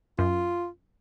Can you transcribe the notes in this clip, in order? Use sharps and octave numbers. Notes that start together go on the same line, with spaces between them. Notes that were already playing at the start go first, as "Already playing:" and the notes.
F#2 F4